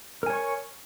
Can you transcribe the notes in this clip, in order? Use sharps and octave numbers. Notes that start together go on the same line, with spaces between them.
A#4 C#5 G#5 C#6